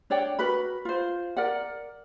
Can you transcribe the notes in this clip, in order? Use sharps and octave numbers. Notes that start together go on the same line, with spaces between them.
D4 C#5 D5 G5
F#4 A#4 B4 B5
F4 C5
A#4 D5 F#5